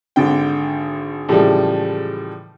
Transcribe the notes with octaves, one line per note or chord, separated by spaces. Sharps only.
G#1 D3 G5
A2 C#3 E3 F3 G3 G#3